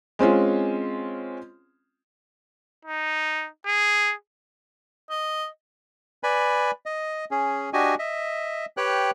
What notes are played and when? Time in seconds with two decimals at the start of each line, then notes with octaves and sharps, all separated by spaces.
0.19 G#3 C4 C#4 F4
2.85 D#4
3.66 G#4
5.10 D#5
6.23 B4 D5 G#5 B5
6.86 D#5
7.31 C#4 G#4
7.73 D4 F#4 G4 D#5 G#5
7.99 D#5 E5
8.77 G4 B4 C#5 G5 F#6